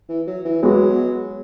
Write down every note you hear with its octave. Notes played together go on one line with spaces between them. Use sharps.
E3
F#3
E3
F#3 G#3 B3 F#4